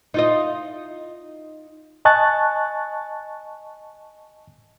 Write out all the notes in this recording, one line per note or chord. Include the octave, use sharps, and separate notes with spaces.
D#4 F4 D#5
D#5 G#5 A5 C#6 F#6 A6